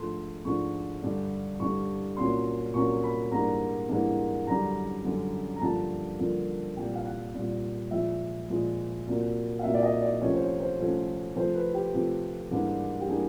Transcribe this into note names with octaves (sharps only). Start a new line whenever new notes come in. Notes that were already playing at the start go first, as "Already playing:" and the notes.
Already playing: G#2 F3 A3 D4 C6
G#2 F3 A3 D4 C#6
G2 D3 G3
G2 D3 G3 C#6
C2 A#2 F#3 A#3 C#4 C6
C2 A#2 F#3 A#3 C#4 C#6
B5
G#2 E3 G3 A#3 D4 A#5
G#2 E3 G3 A#3 D4
F#2 D3 G3 A#5
F#2 D3 G3
A#5
G2 D3 F3 A#3 A5
G2 D3 F3 A#3
C2 A#2 G3 G5
F5
F#5
C2 A#2 G3
A#2 F3 G#3 E5
A#2 F3 G#3
C2 A#2 F#3 A#3
F5
C2 A#2 F#3 A#3 E5
D5
D#5
D5
C2 C3 F3 A3 C#4 C#5
C5
C#5
C5
C2 C3 F3 A3 C#4
C3 F3 A3 C5
B4
G4
C3 F3 A3
G#2 E3 G3 A#3 D4
G4
E3 G3 A#3 D4 G#4